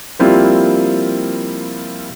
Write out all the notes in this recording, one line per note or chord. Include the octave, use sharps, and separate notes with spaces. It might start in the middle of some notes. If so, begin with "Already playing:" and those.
F3 G3 A#3 C4 E4 F4